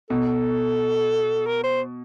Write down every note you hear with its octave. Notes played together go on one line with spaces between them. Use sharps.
B2 A4
A#4
C5